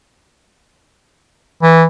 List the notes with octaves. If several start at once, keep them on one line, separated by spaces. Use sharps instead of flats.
E3